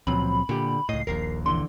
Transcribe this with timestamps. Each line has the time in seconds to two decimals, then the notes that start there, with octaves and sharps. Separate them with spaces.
0.07 C#2 A#2 F3 F#3 C4 B5
0.49 A#2 D3 G4
0.89 C#2 A2 D#5 C7
1.07 D#1 A#1 D#2 A#4
1.46 D3 E3 C6